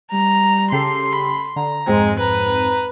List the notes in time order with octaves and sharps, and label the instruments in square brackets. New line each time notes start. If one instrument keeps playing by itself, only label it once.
[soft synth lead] G3 [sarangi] A#5
[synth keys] C#3 G4 A4 [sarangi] C6 [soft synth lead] C7
[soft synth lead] B5
[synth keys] D3 [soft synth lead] A#5
[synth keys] F2 G#2 C4 [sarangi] G#3
[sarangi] B4 [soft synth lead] A#5